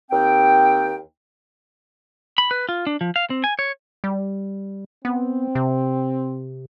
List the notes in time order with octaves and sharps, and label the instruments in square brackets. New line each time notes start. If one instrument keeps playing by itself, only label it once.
[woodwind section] D#2 C4 G5
[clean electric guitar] B5
B4
F4
D4
F3
F5
C4
G#5
C#5
[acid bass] G3
[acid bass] B3 [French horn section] C4
[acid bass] C3